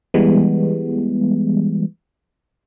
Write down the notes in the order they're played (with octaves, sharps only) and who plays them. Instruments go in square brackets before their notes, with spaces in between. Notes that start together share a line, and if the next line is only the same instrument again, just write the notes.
[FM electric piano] E3 G3 G#3 B3